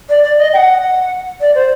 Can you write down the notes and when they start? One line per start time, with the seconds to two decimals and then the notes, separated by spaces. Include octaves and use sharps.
0.09 D5
0.23 D5
0.38 D#5
0.53 G5
0.57 F#5
1.41 D5
1.55 C5